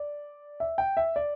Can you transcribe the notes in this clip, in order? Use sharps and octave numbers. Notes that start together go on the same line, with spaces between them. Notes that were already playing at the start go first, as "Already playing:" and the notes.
Already playing: D5
E5
G5
E5
D5